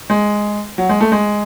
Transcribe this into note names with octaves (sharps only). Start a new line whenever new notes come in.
G#3
F#3
G#3
A3
G#3